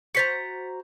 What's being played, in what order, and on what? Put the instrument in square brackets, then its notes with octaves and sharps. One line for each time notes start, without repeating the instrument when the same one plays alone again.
[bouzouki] F#4 C5 A#5 [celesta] A6 B6 C#7